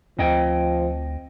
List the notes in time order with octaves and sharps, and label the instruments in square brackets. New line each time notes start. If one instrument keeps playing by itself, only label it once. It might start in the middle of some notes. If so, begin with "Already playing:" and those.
[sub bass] D2 [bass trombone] F3 [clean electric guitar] C4 D#5 G5